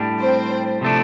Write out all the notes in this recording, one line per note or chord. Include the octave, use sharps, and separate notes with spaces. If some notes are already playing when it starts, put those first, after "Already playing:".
Already playing: A2 G3 D4
C4 C5
C3 F3 A3 D4